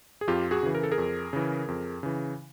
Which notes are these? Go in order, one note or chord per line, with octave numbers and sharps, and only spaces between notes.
G#4
F2 F4 G4
F#4 G#4
C#3 E3
A#4
A4
G#4 A#4
F2
C#3 E3
F2
C#3 E3